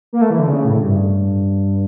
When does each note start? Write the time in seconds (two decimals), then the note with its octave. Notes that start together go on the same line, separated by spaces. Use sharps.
0.13 A#3
0.21 A3
0.30 E3
0.39 D3
0.47 C#3
0.65 A2
0.82 G2